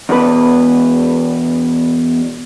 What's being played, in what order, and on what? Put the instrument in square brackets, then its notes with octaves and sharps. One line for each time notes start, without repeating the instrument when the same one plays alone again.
[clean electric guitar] E2 B2 B4